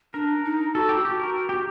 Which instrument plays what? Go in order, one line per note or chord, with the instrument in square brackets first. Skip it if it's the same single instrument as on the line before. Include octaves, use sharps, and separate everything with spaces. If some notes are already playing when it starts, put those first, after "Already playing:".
[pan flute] D4 [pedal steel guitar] A#4
[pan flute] D#4
[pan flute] F#4 [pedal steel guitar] A4
[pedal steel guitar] G4
[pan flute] F#4 [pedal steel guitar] G4
[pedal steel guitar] A#4
G4